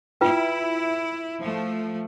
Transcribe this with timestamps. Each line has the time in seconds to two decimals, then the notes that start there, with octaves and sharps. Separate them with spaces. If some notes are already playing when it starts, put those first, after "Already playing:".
0.21 E4 F4 B4 G5
1.40 F3 A3